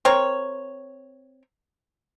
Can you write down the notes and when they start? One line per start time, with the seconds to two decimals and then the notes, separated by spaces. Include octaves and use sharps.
0.05 C4 A#4 C#5